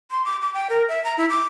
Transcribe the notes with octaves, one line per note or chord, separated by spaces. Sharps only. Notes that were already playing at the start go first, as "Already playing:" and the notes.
C6
D6
D6
G5
A#4
E5
A#5
E4
D6